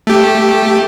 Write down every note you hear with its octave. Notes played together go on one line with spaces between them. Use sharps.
A3 G4